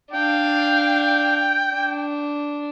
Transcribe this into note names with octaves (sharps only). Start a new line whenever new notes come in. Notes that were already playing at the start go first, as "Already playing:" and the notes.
D4 F5 G5
D4